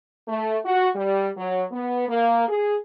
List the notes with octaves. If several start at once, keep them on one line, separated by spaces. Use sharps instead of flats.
A3
F#4
G3
F#3
B3
A#3
G#4